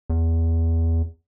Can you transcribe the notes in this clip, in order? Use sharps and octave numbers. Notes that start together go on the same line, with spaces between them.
E2